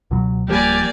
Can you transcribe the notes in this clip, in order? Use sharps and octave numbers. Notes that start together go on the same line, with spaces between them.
C#2 B2 F#3
D1 F3 G3 A#3 G4 D5 G#5